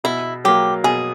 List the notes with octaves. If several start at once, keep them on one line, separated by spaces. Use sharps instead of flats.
B2 E4
F#3 A#3 G4
B2 G#4